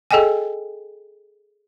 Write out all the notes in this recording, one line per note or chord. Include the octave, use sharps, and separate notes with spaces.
G#4 A4 D#5 G5 G#5